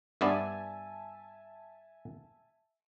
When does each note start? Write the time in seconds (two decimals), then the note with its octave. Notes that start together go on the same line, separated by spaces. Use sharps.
0.21 G2 B3 D5 E5 G#5 A5